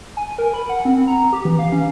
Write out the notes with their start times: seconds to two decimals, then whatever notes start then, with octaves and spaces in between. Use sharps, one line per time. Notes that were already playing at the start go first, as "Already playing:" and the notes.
0.17 G#5
0.39 A#4
0.53 B5
0.69 F#5
0.85 C4
1.07 A#5
1.33 G4
1.45 E3
1.59 F5
1.72 C#4